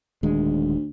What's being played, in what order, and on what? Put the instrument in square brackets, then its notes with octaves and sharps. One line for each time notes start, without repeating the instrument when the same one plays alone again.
[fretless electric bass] D#1 D#3 G#3 [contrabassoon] D2